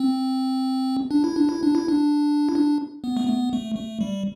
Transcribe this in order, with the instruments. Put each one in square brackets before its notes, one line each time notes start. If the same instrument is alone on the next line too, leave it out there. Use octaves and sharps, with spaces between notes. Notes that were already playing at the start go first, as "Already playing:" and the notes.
Already playing: [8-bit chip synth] C4
D4
E4
D4
E4
D4
E4
D4
E4
D4
B3
A3
B3
A3
A3
G3